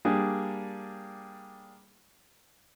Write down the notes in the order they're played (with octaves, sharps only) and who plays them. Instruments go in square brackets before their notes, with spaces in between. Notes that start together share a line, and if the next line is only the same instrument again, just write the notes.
[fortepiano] G3 A#3 D4 G#4